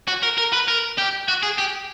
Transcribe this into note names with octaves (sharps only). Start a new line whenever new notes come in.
F#4
A#4
A#4
B4
A#4
G4
F#4
G#4
G4